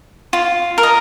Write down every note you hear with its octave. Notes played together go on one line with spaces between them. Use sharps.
F4
A#4
D#5